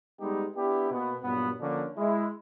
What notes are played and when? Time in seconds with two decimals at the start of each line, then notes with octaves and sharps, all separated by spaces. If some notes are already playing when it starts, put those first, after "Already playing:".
0.19 G3 G#3 B3 D#4 G4
0.55 B3 D4 E4 G4
0.89 B2 A#3 B3
1.22 G2 A#2 F#3 B3
1.59 D3 F3 A#3 C#4 D4
1.97 G#3 E4